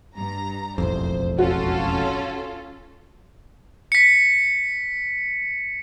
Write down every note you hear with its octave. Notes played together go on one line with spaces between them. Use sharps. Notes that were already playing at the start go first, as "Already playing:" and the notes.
G2 A#5
E1 A1 F2 C5
C#4 F4 F#4 A4
B6 C#7